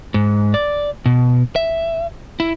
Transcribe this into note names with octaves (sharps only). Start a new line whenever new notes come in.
G#2
D5
B2
E5
E4